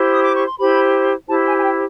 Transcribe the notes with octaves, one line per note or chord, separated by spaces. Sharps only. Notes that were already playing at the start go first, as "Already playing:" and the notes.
Already playing: E4 G4 C5
D#6
D6
C#6
C6
E4 G4 C5 B5
E4 G4 C5 A5
G#5
G#5
G5